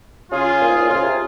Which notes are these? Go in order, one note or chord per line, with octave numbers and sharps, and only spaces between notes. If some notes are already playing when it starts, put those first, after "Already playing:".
C#3 F4 G#4
A#2
G#2
A#2
C#3 F4 G#4
C3